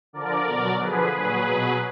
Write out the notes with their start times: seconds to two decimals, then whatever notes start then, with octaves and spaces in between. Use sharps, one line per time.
0.13 D3 F3 A#4 D5
0.46 B2 F#3
0.79 D3 F3 G#4 B4
1.13 A#2 F#3 G#4 B4
1.47 B2 F#3